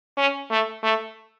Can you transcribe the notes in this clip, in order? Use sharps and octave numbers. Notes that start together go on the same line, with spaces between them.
C#4
A3
A3